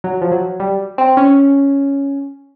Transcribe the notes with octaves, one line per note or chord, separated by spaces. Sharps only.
F#3
F3
F#3
G3
C4
C#4